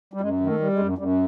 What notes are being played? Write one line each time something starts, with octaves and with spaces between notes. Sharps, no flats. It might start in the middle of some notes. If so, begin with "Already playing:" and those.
G3
F#2 G#3
D#3
A3
G3
G#3
F#2
F#2 G3